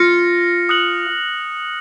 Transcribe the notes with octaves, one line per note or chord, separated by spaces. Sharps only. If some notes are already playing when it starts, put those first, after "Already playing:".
Already playing: F4 F6 A#6 C#7
D#6 F#6 C#7 F#7